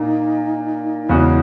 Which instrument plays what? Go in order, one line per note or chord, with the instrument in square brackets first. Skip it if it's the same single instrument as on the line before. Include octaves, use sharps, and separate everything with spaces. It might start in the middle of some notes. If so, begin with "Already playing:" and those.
Already playing: [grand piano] A#2 A#3 [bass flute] D#4
[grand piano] E2 C#3 G#3 C#4 F#4 [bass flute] E4